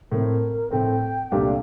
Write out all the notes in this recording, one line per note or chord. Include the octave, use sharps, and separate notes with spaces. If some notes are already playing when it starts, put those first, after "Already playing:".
A2 A3 C4 A#4
A2 A3 C4 G5
C2 A#2 A3 D4 G4 F5